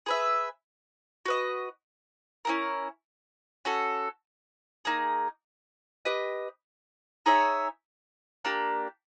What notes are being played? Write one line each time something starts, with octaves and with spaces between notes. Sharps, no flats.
G#4 B4 E5
F#4 B4 D#5
C#4 E4 G4 A#4
C#4 F#4 A4
A#3 D#4 G#4
G4 B4 D#5
D#4 G#4 C#5 E5
A#3 D4 G4